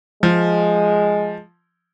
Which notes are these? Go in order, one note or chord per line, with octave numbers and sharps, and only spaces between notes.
F3 G#3